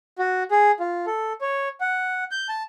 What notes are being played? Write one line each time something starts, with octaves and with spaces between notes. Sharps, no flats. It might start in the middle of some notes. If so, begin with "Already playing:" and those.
F#4
G#4
F4
A4
C#5
F#5
G6
A5